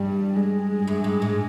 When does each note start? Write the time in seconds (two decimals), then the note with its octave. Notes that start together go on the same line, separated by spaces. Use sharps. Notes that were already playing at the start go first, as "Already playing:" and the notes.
Already playing: G2 G3
0.36 G#3
0.88 F#2
1.04 G2
1.22 G#2